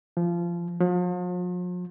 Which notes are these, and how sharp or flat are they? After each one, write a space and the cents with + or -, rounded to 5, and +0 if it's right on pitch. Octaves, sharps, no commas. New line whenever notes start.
F3 -20
F3 +45